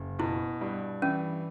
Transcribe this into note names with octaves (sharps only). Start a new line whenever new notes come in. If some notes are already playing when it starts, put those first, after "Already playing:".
Already playing: F#1
B2 E4
G2
E3 C#4